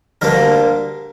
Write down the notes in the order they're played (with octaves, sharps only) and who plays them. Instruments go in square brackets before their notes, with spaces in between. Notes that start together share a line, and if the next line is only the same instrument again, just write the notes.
[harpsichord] D2 D3 G3 A#3 D4 A#4